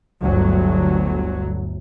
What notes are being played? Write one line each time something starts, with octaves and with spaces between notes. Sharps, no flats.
G1 D2 F#3